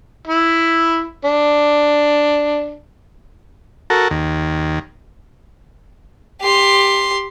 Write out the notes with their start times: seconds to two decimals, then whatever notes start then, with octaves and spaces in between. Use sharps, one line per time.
0.28 E4
1.25 D4
3.90 F#4 A4 A#4
4.10 D#2
6.41 G4 C6